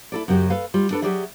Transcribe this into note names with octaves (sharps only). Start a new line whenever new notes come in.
E4 A4 D5
F#2 C#3 F#3 G4 C#5
A4 B4 F5
G3 F4
D4 A4 B4
F#3 G4 G#4 D5 E5